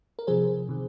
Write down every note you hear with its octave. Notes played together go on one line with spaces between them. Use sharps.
A#4
C3 F3 G#4 C5
C3 D#3